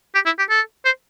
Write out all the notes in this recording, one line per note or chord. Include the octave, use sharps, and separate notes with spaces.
G4
E4
G4
A4
C5